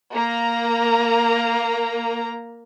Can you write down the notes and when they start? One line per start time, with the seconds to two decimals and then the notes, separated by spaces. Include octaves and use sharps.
0.15 A#3 A#5